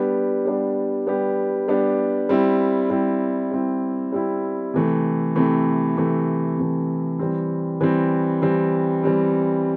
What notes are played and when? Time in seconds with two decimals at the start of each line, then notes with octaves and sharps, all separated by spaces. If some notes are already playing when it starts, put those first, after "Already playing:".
Already playing: G3 B3 D4 G4
0.45 G3 B3 D4 G4
1.07 G3 B3 D4 G4
1.68 G3 B3 D4 G4
2.29 G3 C4 E4
2.90 G3 C4 E4
3.51 G3 C4 E4
4.12 G3 C4 E4
4.74 C3 E3 A3
5.36 C3 E3 A3
5.97 C3 E3 A3
6.58 C3 E3 A3
7.19 E3 G3 C4
7.81 E3 G3 C4
8.42 E3 G3 C4
9.03 E3 G3 C4